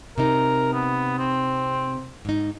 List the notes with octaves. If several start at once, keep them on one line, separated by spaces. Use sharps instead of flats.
C3 D#4 A#4
B3
C4
G#2 D#4